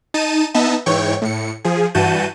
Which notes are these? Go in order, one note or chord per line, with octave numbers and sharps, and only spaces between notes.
D#4 A5 D#7
B3 D#4 D#5 E5 A5
G#2 E3 C#5 G5 C#6
A2 C#7
F3 G#4
G2 E3 F#4 A5 G6 D#7